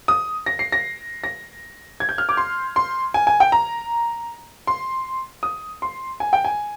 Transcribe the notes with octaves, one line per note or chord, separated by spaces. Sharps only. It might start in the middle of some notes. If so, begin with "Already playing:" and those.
D#6
A#6
C7
A#6
A#6
G#6
G6
F6
D6
C6
C6
G#5
G#5
G5
A#5
C6
D#6
C6
G#5
G5
G#5